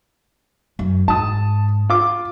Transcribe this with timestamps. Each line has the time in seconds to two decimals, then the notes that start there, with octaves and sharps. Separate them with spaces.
0.79 F#2
1.08 G#2 A5 D#6
1.90 F4 D6